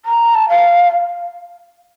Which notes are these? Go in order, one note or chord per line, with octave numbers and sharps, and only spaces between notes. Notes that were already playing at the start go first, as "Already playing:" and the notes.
A#5
A5
F5